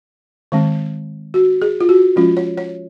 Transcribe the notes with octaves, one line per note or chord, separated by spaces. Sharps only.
D#3 G#3 C4
F#4
G#4
F4
F#4
F3 G#3 C#4 F4
C#5
C#5